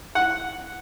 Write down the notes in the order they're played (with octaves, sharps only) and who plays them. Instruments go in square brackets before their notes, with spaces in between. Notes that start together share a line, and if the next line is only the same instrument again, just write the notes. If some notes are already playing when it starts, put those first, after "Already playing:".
[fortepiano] F#5